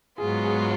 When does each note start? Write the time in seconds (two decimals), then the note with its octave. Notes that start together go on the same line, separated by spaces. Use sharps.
0.18 G#2 F#3 B3 F4 G#4
0.44 G#4